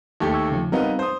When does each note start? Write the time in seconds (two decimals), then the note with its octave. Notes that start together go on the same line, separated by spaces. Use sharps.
0.20 D#2 A3 G4
0.33 C#6 E6 G#6
0.51 C#3 F3
0.72 G3 B3 C4 D#4 A#4 F5
0.99 C5 D#6